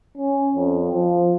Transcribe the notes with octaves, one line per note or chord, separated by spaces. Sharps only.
C#4
F2
F3